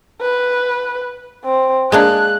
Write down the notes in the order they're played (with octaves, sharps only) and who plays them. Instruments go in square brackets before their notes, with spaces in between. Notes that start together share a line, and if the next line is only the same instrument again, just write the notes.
[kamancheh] B4
C4
[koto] G#3 A#3 D4 [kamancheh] F#6